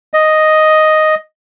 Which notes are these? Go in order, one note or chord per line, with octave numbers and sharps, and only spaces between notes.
D#5